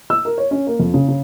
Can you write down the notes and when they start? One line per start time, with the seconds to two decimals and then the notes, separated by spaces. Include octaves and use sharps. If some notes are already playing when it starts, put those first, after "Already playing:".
0.10 E6
0.25 A#4
0.38 C#5
0.51 C#4
0.67 A#3
0.80 F2
0.94 C#3
1.08 C#3